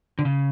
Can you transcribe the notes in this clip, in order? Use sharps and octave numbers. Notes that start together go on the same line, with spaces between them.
D3
C#3